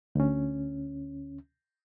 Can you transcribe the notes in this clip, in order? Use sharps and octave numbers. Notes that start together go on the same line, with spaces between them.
D2 C#4